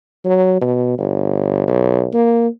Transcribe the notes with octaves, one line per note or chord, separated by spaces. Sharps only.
F#3
B2
G1
B1
A#3